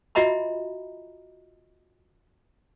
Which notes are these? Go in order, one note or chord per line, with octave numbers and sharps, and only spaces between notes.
F4 F#4 D#5 E5 A#5 B5